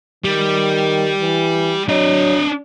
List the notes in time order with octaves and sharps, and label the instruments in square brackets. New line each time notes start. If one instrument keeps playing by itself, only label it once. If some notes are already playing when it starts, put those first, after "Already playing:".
[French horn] D#3 [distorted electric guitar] G3
[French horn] E3
[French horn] F#3 [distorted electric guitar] D4 D#5